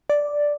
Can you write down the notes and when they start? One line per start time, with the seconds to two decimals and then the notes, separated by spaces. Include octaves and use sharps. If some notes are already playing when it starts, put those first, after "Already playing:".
0.10 D5